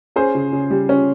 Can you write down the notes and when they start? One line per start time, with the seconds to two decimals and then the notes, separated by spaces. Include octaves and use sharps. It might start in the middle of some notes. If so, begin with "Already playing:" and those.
0.16 C#4 G#4 C5
0.35 C#3
0.53 C#3
0.71 G3
0.89 C#4